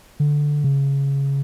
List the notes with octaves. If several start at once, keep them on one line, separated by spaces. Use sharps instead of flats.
D3
C#3